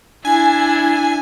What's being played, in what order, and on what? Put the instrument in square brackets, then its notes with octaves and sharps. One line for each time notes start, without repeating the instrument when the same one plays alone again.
[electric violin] D4 E4 [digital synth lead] G#5